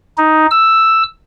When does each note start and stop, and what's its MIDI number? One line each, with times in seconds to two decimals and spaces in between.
0.18 0.47 63
0.51 1.03 88